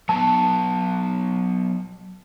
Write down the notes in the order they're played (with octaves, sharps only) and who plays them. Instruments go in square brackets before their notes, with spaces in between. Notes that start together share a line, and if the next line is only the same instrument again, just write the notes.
[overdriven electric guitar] F#3 B3 [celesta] A5